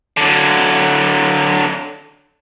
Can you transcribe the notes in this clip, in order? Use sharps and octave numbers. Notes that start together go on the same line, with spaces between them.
D3 F#3